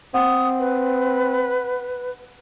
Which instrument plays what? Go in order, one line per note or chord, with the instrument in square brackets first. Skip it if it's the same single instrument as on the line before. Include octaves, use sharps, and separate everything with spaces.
[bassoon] C4 [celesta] F#5 [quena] D#6
[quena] B4